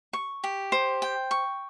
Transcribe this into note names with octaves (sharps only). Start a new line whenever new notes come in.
C#6
G4
C5
G5
C#6